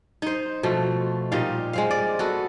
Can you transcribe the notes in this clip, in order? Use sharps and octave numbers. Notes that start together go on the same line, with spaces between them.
D#4 C5
B2 F3 A3
A#2 G3 D#4 F5
G#3 C4 F5
D5
B3 F#4 A4